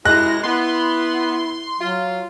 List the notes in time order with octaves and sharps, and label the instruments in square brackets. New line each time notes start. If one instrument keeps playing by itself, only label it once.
[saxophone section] F#2 C3 G#3 [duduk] E4 [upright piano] F#6 [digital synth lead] A#6
[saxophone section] B3 [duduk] E4 [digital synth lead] C6
[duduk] F#3 [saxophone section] F4